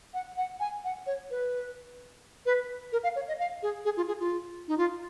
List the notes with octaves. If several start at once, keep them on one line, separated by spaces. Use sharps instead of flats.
F#5
F#5
G#5
F#5
C#5
B4
B4
A#4
F5
C#5
D#5
F5
G#4
G#4
F4
G#4
F4
D#4
F4